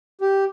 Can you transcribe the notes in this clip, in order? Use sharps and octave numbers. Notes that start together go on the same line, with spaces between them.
G4